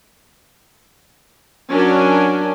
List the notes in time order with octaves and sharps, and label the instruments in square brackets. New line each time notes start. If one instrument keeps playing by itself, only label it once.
[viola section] F#3 C#4 D4 A#4 G#5